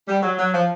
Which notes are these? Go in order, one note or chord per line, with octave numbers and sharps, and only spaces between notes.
G3
F#3
F#3
F3